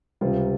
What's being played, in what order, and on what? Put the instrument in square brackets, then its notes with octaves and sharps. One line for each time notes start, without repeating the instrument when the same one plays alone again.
[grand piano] C#2 C3 G3 F4